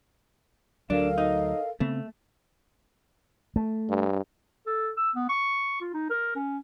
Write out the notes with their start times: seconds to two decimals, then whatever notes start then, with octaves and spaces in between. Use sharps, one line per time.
0.90 D2 F#3 D4 A4 A#4 F5
1.18 D#4
1.80 C#3 A3 B3 C4
3.56 A3
3.89 G2
4.66 A4
4.97 E6
5.15 B3
5.29 C#6
5.81 F4
5.94 D#4
6.10 A#4
6.36 C#4